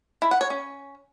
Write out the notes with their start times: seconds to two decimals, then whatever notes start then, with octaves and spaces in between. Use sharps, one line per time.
0.22 E4
0.31 F#5
0.41 C#5
0.50 C#4